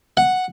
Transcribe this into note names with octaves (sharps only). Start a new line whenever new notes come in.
F#5